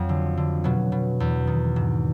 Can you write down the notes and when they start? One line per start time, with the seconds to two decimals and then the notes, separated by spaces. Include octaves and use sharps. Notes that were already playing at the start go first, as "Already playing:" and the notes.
Already playing: F2 F#3
0.09 D3
0.37 D3
0.64 B2 F#3
0.92 B2
1.20 E2
1.47 D#3
1.76 G#2